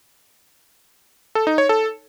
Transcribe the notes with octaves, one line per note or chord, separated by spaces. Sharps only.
A4
D#4
C#5
A4